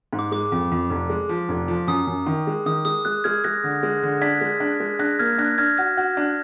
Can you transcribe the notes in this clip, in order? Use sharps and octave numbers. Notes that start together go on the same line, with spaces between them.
G#2
D6
G#3 D6
F2
F2
F1
G#3
F3
F1
F3
F#2 D#6
F#2
D#3
G#3
D#3 D#6
G#3 D#6
G#3 F#6
G#3 F6 G#6
G#3 F#6 A#6
D3
G#3
D3
D4 G#6 B6
G#3
D4
G#3
D4 F#6 A#6
A#3 F6 G#6
D4 F#6 A#6
D4 F6 G#6
F#4 F6 G#6
F#4
D4